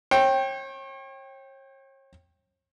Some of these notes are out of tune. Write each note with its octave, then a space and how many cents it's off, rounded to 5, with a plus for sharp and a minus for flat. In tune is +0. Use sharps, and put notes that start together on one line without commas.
C#5 -40 G5 +0